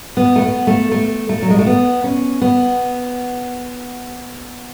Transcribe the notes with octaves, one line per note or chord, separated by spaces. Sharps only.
B3
A3
B3
A3
A3
A3
F#3
G#3
A3
B3
C#4
B3